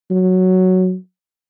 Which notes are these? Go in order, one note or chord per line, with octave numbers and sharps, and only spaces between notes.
F#3